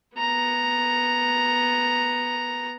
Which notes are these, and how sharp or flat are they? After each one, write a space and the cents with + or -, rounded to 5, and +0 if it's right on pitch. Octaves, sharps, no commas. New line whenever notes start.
B3 +0 A#5 +0